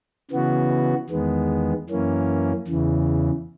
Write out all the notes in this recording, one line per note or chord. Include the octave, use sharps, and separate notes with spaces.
C#3 E3 B3 F#4
E2 D#3 G#3 B3
F#2 E3 A#3 C#4
E2 C#3 E3